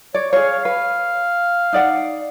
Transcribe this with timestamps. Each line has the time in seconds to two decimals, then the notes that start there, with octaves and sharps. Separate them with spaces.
0.14 C#5 D5
0.33 G#4 C#5 F5
0.65 B4 F5
1.73 D#4 D5 F#5